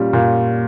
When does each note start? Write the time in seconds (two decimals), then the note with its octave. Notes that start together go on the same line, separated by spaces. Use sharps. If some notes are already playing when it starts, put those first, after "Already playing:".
Already playing: A#2 G3 C#4 F4
0.13 A#2